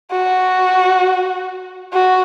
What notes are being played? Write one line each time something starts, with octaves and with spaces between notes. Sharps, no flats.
F#4
F#4